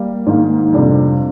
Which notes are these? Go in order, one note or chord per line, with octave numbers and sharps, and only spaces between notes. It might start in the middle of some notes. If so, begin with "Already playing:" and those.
Already playing: G3 A#3
G#2 D#3 A#3
F2 C3 G3 D4